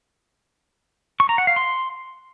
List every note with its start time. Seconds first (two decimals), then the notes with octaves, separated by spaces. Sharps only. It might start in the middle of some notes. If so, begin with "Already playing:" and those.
1.20 C#6
1.29 A#5
1.38 F#5
1.47 F5
1.56 C6